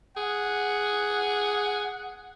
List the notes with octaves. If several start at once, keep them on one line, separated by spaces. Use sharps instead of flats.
G#4 F#5